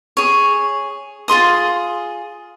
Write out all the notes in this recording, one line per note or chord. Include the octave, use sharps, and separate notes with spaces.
G#4 C#5
F4 G#4 C6 D#6